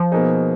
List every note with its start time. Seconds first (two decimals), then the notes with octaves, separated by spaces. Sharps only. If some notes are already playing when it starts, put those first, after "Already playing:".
Already playing: F3
0.12 B2 A#3 D#4 G#4